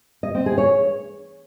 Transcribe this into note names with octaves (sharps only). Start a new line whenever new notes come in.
D#5
C4
G#4
C#5